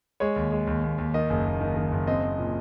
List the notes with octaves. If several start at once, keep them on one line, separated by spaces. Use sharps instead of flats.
G#3 C#5
D#2
G#3
D#2
D#2
D#2
D#3 D#5
F#1
F#1
D#3
D#3
F#1
C4 D#5
C4
A#2